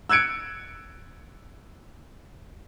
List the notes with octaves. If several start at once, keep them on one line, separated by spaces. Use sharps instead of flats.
E6 F#6 G#6 C#7 D7